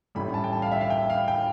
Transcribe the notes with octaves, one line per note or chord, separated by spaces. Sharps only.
A1 A2 G3 B5
A5
G5
A5
F5
E5
F5
G5
F5
G5